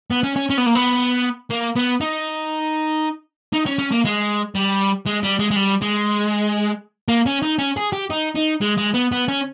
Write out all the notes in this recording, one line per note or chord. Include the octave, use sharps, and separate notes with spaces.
B3
C#4
C#4
C#4
B3
A#3
B3
A#3
B3
D#4
D#4
C#4
C#4
A#3
G#3
G3
G#3
G3
G#3
G#3
G3
G#3
A#3
C#4
D#4
C#4
G#4
G4
D#4
D#4
G#3
G#3
B3
B3
C#4